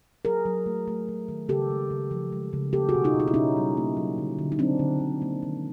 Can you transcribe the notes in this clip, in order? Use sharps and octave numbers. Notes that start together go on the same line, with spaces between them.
F#3 G#4 A#4
F#3
A3
A3
F#3
D#3
C#3 G4 A4
G#3
C#3
F3
G#3
C#3
A#3 G4 A4
F#4 G#4
B2
D#4 F4
B2
D#4
E4
B2 C#4 D#4
G3
A#3
F#3
D3
D3
D#4
F#3 C4 D4
D3
D3
A#3
D#3